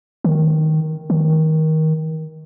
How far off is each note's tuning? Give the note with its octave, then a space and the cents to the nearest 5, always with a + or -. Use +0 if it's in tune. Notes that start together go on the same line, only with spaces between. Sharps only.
D#3 +5
D#3 +20